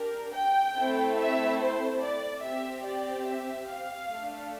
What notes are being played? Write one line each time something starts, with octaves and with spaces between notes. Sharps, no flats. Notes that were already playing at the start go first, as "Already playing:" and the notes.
Already playing: D4 G4 A#4
G5
A3 C4 E4 A4
E5
C5
D5
C4 G4 E5
D5
E5
F5
A3 D4 A4